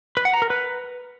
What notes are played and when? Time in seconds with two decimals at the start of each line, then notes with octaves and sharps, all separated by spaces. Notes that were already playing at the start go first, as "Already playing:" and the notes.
0.17 B4
0.25 F#5
0.34 A#5
0.42 A#4
0.50 B4